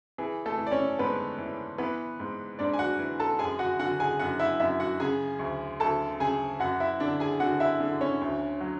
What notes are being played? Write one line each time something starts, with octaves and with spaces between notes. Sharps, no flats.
E3 G#4
A3 A4
E3
D5
C#4 C#5
G#2 B3 B4
E3
E3 B3 B4
G#2
G#2 D4 D5
G#5
F#4 F#5
E3
A4 A5
F#2 G#4 G#5
F#4 F#5
D3 F#4 F#5
G#4 G#5
F#2 F#4 F#5
E4 E5
F#2 E4 E5
F#4 F#5
C#3 G#4 G#5
D2
D2 A4 A5
C#3 G#4 G#5
F#2 F#4 F#5
E4 E5
D3 D4 D5
G#4 G#5
D3 F#4 F#5
E4 E5
D3
C#4 C#5
D2
F#3